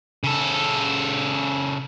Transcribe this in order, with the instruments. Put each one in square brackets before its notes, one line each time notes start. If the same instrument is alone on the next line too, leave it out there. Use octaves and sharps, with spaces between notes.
[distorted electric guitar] C#3 A4